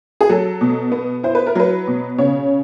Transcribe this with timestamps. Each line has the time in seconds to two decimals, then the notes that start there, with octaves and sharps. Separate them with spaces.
0.21 G#4
0.29 F#3 A4
0.61 B2
0.92 B3
1.23 E4 C5
1.35 B4
1.47 A#4
1.55 F#3 B4
1.87 B2
2.18 C#3 C#5